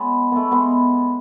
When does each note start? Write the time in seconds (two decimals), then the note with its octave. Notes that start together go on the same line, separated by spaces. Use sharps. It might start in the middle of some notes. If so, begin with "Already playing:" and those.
Already playing: G#3 B3 C#4
0.32 A3 B3
0.51 G#3 B3